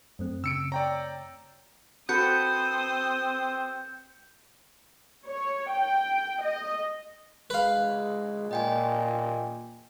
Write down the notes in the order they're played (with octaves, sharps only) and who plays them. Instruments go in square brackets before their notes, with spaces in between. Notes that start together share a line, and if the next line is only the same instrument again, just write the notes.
[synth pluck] F#2 A3 C4
[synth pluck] C#3 [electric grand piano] E6 C#7 D7
[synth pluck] C#5 [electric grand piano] D5 G5 A#5
[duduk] C4 [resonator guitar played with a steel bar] F#4 A4 B4 [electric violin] C5 D#6 [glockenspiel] G6 C#7
[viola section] C#5
G5
D#5
[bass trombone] G#3 [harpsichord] B4 F5
[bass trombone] A#2 [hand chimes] D#5 G5 G#5